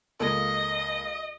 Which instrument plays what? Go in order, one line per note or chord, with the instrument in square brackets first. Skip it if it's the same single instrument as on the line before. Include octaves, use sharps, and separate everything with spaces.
[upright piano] C#2 A#3 A4 [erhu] D#5